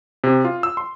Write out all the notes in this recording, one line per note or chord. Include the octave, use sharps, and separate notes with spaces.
C3
F4
E6
C6